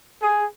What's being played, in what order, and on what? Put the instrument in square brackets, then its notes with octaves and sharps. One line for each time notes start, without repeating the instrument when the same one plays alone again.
[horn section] G#4